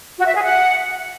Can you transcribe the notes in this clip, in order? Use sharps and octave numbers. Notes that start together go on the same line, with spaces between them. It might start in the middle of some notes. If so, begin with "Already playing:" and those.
F#4
E5
G#4
F#5